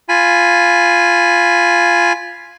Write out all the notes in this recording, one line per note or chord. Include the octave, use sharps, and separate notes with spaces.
F4 G#5 B5